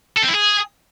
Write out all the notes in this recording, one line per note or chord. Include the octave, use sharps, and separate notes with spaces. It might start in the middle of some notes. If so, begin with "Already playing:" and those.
A4
C4
E4
G#4